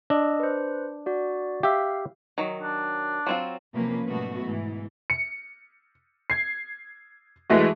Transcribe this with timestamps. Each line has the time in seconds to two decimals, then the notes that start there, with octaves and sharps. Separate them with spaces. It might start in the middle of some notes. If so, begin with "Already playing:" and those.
0.10 D4 D#5 E6
0.40 B4 C5
1.06 F#4 D5
1.63 G4 E5 F5
2.38 D#3 F#3
2.62 D4
3.27 F#3 C4 F4
3.74 C3 F3 F#3 A#3 C#4 B4
4.07 G#2 B2 G3 A3 B3 F#4
4.44 G#2 E3
5.10 C#7
6.30 G#6 C7
7.50 E3 G#3 A3 F#4